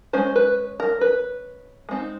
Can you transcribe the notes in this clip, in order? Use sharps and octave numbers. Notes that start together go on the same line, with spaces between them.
G#3 C#4 C5
B4
A#4
B4
G#3 C4 D#4